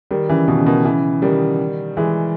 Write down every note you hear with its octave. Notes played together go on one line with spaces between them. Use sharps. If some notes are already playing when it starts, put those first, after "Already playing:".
D#3 G3
C#3 E3
B2 D#3
C#3
B2 D#3
C#3 E3
D#3 G3
E3 G#3